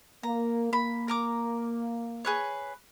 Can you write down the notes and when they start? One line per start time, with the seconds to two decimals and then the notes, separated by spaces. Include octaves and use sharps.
0.23 A#3 A#5
0.73 A#3 B5
1.08 A#4 A#5 D6
2.25 G#4 B4 C#5